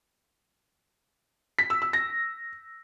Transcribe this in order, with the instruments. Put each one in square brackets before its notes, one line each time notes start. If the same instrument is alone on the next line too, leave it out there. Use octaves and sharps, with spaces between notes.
[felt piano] B6
E6
E6
A#6